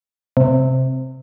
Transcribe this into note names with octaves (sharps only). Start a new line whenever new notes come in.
C3